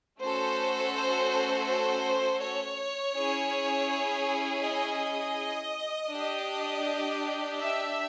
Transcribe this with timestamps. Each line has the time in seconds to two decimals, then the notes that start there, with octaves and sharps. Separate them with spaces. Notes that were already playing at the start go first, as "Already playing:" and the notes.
0.20 A3 C#4 F#4 A4 C5
0.94 C5
1.68 C5
2.41 C#5
3.15 C#4 E4 G#4
4.63 D#5
6.11 D4 G4
7.59 E5